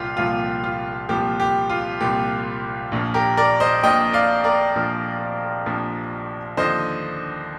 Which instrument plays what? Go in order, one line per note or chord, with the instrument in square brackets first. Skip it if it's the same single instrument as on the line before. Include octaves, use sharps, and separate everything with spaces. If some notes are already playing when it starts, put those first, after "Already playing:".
Already playing: [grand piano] C2 A#2 F3 F4 G4
C2 A#2 F3 F4
F4
C2 A#2 F3 G4
G4
F4
C2 A#2 F3 G4
A#1 A#2 F3
G4 A#4
A#4 D5
C5 D#5
A#1 A#2 F3 D#5 G5
D5 F5
A#4 D5
A#1 A#2 F3
A#1 A#2 F3
D#2 D3 F3 C5 D#5